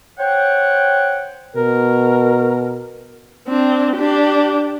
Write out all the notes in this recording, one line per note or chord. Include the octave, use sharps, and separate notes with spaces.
C5 C#5 F#5 G5
B2 A#4
C4 D4
D4 G4